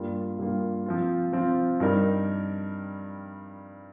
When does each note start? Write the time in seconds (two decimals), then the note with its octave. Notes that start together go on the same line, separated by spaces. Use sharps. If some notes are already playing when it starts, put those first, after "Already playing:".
Already playing: G2 G3 A#3 F4
0.38 G2 G3 A#3 F4
0.86 F3 C4 F4
1.33 F3 C4 F4
1.80 G2 G3 D#4 A#4